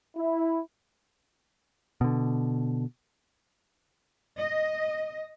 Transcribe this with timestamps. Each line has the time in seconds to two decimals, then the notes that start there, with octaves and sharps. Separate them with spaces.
0.17 E4
2.01 B2 D3
4.38 D#5